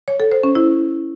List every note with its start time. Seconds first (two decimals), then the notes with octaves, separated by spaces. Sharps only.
0.08 C#5
0.20 A4
0.32 C5
0.43 C#4
0.55 E4